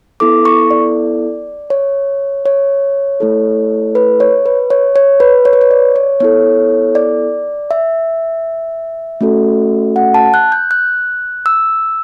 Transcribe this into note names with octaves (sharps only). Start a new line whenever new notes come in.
B3 E4 A4 D6
C#6
D5
C#5
C#5
A3 E4 A4
B4
C#5
B4
C#5
C#5
B4
C#5
B4
C#5
D5
C#5
B3 E4 A4 C#5
D5
E5
A3 C#4 F#4 A4
F#5
A5
F#6
G6
F#6
E6